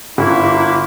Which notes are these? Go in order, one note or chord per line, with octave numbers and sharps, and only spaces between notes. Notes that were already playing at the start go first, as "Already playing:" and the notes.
G1 A#3 E4 F#4 D6